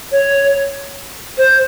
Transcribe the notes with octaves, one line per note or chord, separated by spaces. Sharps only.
C#5
C5